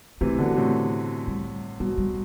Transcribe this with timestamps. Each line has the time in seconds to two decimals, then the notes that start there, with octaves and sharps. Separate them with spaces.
0.21 C3 E3 A3
0.39 B2 D3
0.57 A2 C3
1.28 G3
1.80 B2 G3
1.98 G3